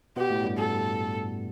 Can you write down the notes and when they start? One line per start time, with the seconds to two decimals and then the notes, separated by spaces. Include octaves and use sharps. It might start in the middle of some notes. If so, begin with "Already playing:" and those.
0.16 B2 B3 G4
0.30 A2 A3
0.44 G2 G3
0.58 A4